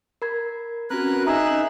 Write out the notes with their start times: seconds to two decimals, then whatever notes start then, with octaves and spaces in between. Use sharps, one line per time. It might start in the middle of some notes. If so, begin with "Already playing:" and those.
0.22 A#4 B5 G#6
0.90 C4 C#4 F#4 A#4 B4 F#6
1.27 D#4 G#4 E5 A#5 D#6 F#6